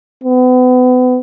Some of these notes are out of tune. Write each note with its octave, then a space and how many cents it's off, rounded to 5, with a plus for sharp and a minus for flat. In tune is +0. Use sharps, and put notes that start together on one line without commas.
B3 +35